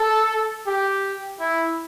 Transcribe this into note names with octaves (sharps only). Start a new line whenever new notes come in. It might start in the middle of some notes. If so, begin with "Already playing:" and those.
Already playing: A4
G4
E4